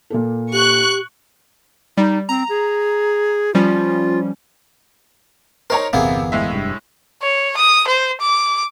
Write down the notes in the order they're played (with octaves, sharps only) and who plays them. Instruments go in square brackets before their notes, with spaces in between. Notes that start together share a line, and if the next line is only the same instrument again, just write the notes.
[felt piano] A#2 A#3 A4
[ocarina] G4 [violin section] C#6 F#6
[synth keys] G3 [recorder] D#4
[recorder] C4 [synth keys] A#5
[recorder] G#4
[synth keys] F3 G3 C#4 [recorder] F4
[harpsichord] D#4 C5 [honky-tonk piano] A#4 C#5 A#5
[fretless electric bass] G1 E2 [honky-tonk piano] C3 [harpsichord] A#3 B3 G#4
[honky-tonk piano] A2 G#3 E5
[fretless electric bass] F1 G2
[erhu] C#5
D#6
C5
D6